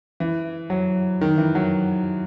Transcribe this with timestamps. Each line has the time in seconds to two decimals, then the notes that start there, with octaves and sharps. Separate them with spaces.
0.20 E3
0.70 F#3
1.21 D#3
1.38 E3
1.55 F#3